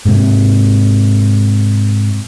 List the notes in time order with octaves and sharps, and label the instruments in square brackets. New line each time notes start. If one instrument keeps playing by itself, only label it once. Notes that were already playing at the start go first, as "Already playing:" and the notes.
[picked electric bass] G#2 C3